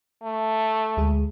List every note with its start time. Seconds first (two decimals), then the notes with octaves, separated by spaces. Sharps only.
0.23 A3
0.97 D2 G#3 G#4